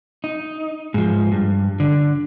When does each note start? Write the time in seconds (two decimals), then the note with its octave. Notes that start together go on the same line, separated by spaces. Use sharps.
0.24 D#4
0.94 G#2 F3
1.32 G2
1.80 D3